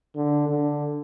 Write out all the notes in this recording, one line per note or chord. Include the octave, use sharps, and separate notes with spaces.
D3
D3